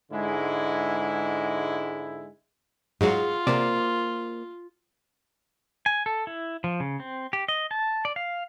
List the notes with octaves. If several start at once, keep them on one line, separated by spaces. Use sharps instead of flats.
G#2 D3 G#3 E4
G#2 F#3 F4 G#4 F5 F#5
C3 A#3 C5 D5
G#5
A4
E4
F3
C#3
C4
G4
D#5
A5
D5
F5